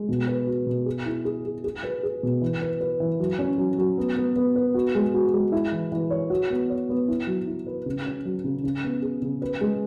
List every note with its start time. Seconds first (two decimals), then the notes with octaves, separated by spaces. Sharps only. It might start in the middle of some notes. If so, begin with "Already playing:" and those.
Already playing: G#3
0.09 B2
0.27 B4
0.47 F#4
0.66 B2
0.86 G#4
1.06 E4
1.25 G#4
1.45 G#4
1.64 G#4
1.83 B4
2.03 G#4
2.23 B2
2.42 E3
2.61 B4
2.81 B4
3.00 E3
3.19 F#3
3.39 C#4
3.58 F#3
3.78 F#3
3.98 B3
4.16 B3
4.36 B3
4.56 B4
4.74 F#4
4.95 G#3
5.14 F#4
5.34 G#3
5.52 E4
5.72 E3
5.92 E3
6.11 C#5
6.30 F#4
6.50 B3
6.70 C#5
6.89 B3
7.08 E4
7.27 F#3
7.47 E4
7.67 B4
7.86 C#3
8.06 C#4
8.25 F#3
8.44 C#3
8.64 C#3
8.84 B3
9.02 G#4
9.22 C#3
9.42 B4
9.61 G#3